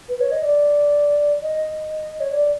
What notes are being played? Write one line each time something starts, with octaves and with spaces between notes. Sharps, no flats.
B4
C#5
D#5
D5
D#5
C#5
D5